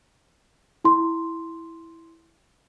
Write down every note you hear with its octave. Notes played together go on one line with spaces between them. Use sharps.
E4 C6